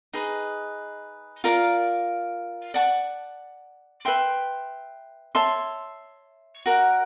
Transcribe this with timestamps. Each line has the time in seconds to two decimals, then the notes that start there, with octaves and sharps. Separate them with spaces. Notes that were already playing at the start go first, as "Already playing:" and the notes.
0.13 D#4 G#4 B4 D#5
1.44 F4 A#4 D5 F5
2.74 D5 F#5 A5 C#6
4.05 B4 E5 G5 C6
5.35 C#5 E5 A5 C6
6.66 F#4 A#4 D5 F#5